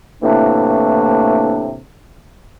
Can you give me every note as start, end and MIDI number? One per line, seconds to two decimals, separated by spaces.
0.22 1.78 45
0.22 1.78 48
0.22 1.78 52
0.22 1.78 57
0.22 1.78 58
0.22 1.78 62